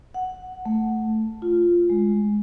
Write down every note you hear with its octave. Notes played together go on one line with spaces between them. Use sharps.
F#5
A3
F4
G#3